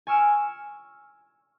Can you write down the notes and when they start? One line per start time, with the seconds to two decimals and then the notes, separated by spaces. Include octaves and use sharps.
0.07 G#5 C#6 E6 F6 D7 E7